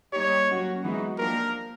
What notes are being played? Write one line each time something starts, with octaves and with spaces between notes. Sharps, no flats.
G3 A#3 D#4 G4 C#5
F#3 A#3 C#4 F#4
E3 G#3 B3 D#4 F#4
F3 A#3 D4 G4 A#4